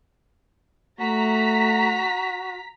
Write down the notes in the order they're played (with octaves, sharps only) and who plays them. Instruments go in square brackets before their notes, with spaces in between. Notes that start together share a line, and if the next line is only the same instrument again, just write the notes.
[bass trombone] A3 [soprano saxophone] F#4 [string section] A#5 B6